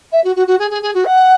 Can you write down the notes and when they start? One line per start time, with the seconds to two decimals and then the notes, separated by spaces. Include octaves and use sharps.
0.12 E5
0.24 F#4
0.35 F#4
0.47 F#4
0.59 G#4
0.70 G#4
0.82 G#4
0.94 F#4
1.05 F#5